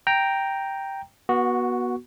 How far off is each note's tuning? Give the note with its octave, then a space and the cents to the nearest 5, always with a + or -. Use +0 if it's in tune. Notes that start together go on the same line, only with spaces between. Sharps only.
G5 +0 A#5 +0
B3 -30 F#4 +0